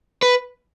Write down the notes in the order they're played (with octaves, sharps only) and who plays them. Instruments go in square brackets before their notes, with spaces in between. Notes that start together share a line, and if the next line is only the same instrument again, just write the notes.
[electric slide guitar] B4